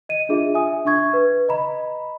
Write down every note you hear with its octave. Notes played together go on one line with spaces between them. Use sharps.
D#5 D#7
D4 F4 G#4 E5
E5 G#5 D#6
D4 E5 C#6 G#6
B4
D#5 A#5 B5